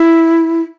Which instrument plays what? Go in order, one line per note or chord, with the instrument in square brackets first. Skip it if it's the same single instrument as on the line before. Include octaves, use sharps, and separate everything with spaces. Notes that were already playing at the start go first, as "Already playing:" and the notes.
Already playing: [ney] E4